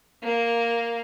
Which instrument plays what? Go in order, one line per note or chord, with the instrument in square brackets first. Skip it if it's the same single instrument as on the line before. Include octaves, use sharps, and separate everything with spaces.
[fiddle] A#3